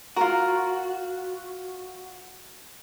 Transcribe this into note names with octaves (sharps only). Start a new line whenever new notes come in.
F4 F#4 A#4